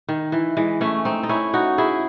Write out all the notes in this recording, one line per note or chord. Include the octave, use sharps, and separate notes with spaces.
D#3
E3
E3 G#3
A3 C#4
C4 D#4
D#4
C#4 E4
D#4 F#4
E4 G#4